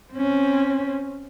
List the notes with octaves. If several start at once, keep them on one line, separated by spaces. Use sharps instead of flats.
C4 C#4